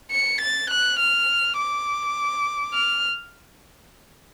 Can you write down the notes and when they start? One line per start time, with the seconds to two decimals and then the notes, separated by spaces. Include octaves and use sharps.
0.12 C#7
0.41 A6
0.70 F#6
0.99 F6
1.58 D6
2.74 F6